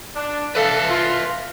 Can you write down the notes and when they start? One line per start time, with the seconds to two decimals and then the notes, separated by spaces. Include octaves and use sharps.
0.16 D4
0.55 A4 B4 E5 F5
0.89 F4